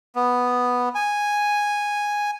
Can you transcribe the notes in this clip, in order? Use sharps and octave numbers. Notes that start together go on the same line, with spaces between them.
B3
G#5